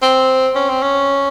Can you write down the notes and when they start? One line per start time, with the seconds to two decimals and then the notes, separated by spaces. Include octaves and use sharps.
0.02 C4
0.55 C#4
0.69 C4
0.82 C#4